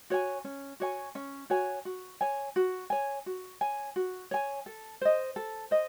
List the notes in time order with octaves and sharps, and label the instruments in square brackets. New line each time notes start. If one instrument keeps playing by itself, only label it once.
[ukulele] F#4 C#5 G#5
C#4
F#4 C#5 G#5
C#4
F#4 C#5 G#5
F#4
C#5 G#5
F#4
C#5 G#5
F#4
C#5 G#5
F#4
C#5 G#5
A4
C5 D#5
A4
C5 D#5